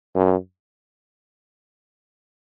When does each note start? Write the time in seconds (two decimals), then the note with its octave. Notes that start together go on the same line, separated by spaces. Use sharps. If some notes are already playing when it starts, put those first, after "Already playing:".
0.15 F#2